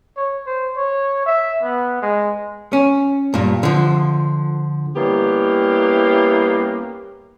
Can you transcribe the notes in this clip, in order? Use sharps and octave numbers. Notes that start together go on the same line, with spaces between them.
C#5
C5
C#5
E5
B3
G#3
C#4
G2 A#2
D3 F3
G3 A#3 B3 C#4 E4 G4